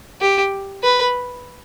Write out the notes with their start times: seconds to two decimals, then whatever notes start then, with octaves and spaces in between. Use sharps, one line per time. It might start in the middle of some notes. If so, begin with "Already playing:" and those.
0.21 G4
0.83 B4